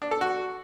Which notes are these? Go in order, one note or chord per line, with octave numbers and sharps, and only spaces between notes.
D4
A4
F#4